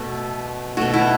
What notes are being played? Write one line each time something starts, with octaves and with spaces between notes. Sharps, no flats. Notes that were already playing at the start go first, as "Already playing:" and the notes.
Already playing: B2 A3
B2 A3 F#4
E4